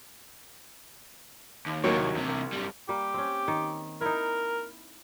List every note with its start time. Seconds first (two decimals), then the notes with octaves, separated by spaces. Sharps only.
1.66 D#2
1.84 D#2 A2 F#3 A#3 C#5
1.96 C2
2.15 E2 C3
2.29 C2
2.52 F#2 G3
2.89 G3 A#3 G4
3.14 C4 C#4
3.48 D#3
4.01 D#4 E4 A#4